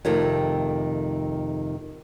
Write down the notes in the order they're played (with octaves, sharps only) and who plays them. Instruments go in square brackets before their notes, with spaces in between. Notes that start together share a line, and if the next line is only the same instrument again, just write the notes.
[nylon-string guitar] F2 C3 D#3 A3